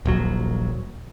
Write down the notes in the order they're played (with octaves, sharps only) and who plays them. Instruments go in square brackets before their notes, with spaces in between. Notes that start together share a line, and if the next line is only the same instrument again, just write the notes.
[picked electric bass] D#1 A#1 F#3